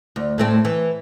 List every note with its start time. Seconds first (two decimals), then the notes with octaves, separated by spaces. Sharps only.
0.16 D2
0.38 A2 A3 C4
0.65 E3